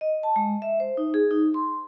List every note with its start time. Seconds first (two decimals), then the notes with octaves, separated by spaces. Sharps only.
0.01 D#5
0.23 A5
0.36 G#3
0.62 E5
0.80 C5
0.97 D#4
1.14 G#4
1.31 D#4
1.54 C6